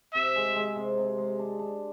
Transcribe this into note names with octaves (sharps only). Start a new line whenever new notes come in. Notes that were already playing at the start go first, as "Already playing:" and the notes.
C3 E5
G#3
G#3
C3
C3
G#3
D4
D4